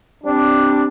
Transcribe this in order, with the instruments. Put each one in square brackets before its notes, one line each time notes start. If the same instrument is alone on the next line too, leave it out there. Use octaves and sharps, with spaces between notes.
[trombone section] G3 C4 D4